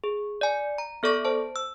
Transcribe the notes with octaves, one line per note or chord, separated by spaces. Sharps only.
G#4
D5 G#5
A#5
B3 A4 D5 C#6 A#6
C5 A5
E6